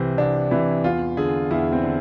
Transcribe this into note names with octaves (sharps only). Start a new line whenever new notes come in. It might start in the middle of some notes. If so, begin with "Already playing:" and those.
Already playing: C2 C3 E3 C4
C2 D4
C3 E3 E4
E2 F4
D3 G#4
E2 E4
C4
D3